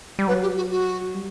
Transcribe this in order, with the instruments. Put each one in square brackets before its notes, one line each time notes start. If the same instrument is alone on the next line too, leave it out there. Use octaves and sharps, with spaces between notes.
[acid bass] G3
[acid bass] F#3 [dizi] B4
[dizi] G4
F#4
F#4
[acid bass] G3